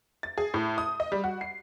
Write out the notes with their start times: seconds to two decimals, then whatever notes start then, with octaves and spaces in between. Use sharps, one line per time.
0.23 A6
0.38 G#4
0.54 A2
0.78 D#6
1.00 D#5
1.12 G3
1.24 F#4
1.41 C7